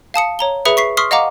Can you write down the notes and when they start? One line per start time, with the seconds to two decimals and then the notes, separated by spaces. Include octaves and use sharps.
0.14 F5 A5 D#6 C#7
0.39 C#5 A#5 G7
0.65 G#4 B4 E5 B5 D#6 C#7
0.77 C#6 B6 C7
0.97 C6 C#6 D#6 F6 B6 C7
1.11 D#5 F5 F#5 A#5 D6